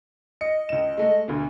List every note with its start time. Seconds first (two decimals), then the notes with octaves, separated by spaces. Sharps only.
0.41 D#5 C#7
0.69 C#2 E7
0.97 G#3 A3
1.28 D2 B2